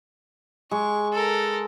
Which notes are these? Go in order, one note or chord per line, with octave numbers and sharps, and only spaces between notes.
G#3 C#6
A4 A#4